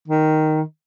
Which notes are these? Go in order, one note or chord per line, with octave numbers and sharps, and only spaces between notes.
D#3